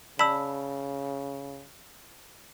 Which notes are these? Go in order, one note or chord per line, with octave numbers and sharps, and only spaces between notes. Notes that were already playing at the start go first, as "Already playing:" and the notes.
C#3 D5 A5 B5 E6 B6